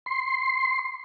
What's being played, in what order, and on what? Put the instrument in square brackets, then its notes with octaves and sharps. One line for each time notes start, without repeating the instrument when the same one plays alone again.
[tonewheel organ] C6